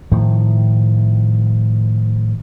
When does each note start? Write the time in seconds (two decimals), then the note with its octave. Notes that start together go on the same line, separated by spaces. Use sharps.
0.12 A2 D#3 F3